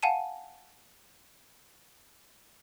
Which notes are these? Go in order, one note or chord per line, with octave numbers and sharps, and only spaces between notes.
F5 F#5 G#5 A5 D#7